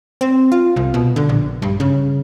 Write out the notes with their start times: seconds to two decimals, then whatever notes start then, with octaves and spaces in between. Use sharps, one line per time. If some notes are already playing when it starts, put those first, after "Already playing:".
0.21 C4
0.52 F4
0.76 C2
0.94 B2
1.16 D3
1.29 A#1
1.62 G2
1.80 C#3